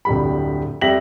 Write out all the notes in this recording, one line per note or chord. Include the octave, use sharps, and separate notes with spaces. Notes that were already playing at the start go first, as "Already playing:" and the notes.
D1 F2 G3 B5
F2 G3 E5 A#6 B6 F#7